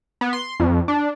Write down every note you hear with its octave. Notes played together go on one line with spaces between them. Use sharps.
B3
C6
F2
D4